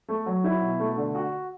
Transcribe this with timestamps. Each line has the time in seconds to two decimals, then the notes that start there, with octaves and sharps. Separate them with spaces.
0.08 A3
0.26 F#3
0.44 E4
0.61 B2
0.79 A3
0.97 D3
1.15 F#4